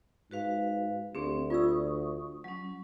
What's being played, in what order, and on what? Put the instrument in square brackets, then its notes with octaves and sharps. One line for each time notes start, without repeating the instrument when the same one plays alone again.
[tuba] G#2 [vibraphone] F#4 B4 F5
[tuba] D2 [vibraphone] C4 [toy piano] G4 G#4
[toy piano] F4 D5 E6 [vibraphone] C#6 D#6
[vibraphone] F#3 C#4